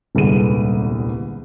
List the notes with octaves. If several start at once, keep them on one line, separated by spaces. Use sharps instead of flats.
D#1 C2 D3 G#3 B3 D#7